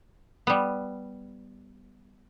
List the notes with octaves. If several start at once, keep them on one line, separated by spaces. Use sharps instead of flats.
G3 B3